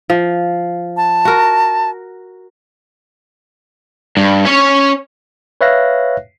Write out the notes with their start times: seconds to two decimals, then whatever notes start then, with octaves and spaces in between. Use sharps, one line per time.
0.10 F3
0.97 A5
1.25 F#4 A#4
4.17 G2
4.46 C#4 C#5
5.61 B4 C#5 E5 F5 F#6 A#6